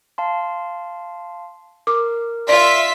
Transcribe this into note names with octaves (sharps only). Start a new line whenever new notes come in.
F5 A5 C6
A#4 D6
F4 D5 E5 C6 B6